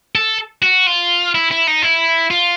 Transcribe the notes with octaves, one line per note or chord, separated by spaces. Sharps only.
A4
F#4
F4
E4
E4
D#4
E4
F4